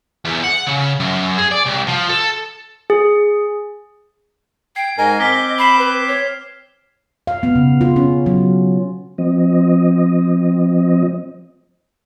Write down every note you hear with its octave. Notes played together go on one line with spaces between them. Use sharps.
E2
F#5
C#3
F#2
G#4
D5
C2
F3
A4
G#4
G5 G#6 C7
G#2 A#4 D#5 G#5
C4 D6 F6 B6 G7
B5 B6 C7 E7
B4
C#5
F5
B3
C#3
F4
C#4
F#3
F3 C4 D#5